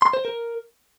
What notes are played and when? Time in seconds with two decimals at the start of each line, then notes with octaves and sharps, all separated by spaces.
0.02 C6
0.13 C5
0.25 A#4